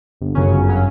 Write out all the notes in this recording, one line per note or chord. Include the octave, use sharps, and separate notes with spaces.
G1
F#2 C#3 F#3 C#4
G1
C#3 F#3 C#4